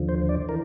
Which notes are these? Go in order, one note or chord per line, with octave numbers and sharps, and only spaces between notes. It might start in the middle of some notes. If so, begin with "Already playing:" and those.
Already playing: D#2 D3 F3
C5
D5
E3 A#4